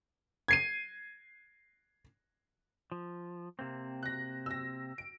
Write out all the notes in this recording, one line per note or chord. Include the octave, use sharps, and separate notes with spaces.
G#6 C7 D#7
F3
C3 A#3 C4
F#6 A#6
E6 A#6
D7